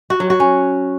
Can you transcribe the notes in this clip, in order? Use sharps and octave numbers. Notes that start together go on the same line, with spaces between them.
F#4
F#3
F#4
C#4